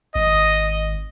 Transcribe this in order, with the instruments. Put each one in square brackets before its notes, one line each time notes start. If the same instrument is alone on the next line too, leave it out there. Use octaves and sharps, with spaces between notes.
[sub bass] G#1 [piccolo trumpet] D#5